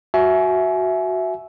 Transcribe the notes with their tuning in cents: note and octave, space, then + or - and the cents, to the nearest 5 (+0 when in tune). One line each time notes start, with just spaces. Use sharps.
F#4 +0 E5 +0 G#5 +30